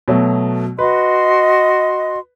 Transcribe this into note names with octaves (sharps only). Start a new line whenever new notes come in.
B2 F#3 A3
F#4 B4 D#5 C6